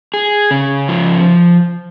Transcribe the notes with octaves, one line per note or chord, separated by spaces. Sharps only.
G#4
C#3
F3